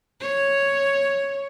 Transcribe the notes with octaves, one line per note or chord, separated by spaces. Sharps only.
C#5